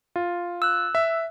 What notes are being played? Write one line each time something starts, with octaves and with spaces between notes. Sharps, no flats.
F4
E6 F#6
E5